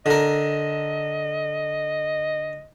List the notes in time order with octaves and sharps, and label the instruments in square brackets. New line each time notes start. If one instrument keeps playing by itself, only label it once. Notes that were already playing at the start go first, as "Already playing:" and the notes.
[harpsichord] D3 A#4 [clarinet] D#5